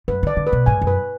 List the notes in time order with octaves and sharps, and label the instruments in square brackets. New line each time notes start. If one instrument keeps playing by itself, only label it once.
[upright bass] F#2 [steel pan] B4
[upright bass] D3 [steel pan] D5
[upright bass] D3
[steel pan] B4
[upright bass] B2
[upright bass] G#2 [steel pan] G#5
[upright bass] F#2
[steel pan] B4